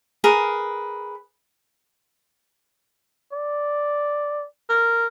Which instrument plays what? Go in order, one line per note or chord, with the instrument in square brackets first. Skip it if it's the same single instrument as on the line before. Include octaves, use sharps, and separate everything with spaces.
[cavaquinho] G#4 A#4 B4
[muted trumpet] D5
[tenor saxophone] A#4